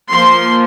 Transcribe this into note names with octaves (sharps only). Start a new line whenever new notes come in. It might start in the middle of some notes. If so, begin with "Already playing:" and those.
F3 A#3 C6